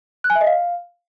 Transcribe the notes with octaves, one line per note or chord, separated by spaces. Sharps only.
F#6
G#5
E5
D#5
F5